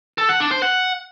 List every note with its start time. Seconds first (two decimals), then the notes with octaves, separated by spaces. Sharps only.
0.18 A4
0.29 F#5
0.40 D4
0.51 C5
0.62 F#5